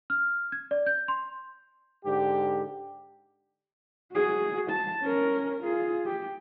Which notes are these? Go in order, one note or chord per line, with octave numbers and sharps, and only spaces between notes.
F6
G#6
D5
G6
C6
G#2 D3 G4
F#4 G#4
A5
C#4 A#4
F4 G#4
G4